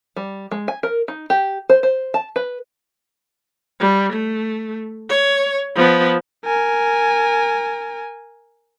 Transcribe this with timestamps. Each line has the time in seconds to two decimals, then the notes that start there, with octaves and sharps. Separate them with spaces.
0.16 G3
0.51 G#3
0.68 G#5
0.83 A#4
1.08 D#4
1.30 G4
1.70 C5
1.83 C5
2.14 A5
2.36 B4
3.80 G3
4.13 A3
5.09 C#5
5.76 F3 B3
6.45 A#4 G#5